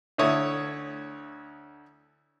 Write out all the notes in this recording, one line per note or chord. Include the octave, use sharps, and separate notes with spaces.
D2 A3 E4 C#5 D#6